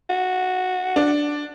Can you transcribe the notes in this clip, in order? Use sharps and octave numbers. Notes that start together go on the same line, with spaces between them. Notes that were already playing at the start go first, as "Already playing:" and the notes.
F#4
D4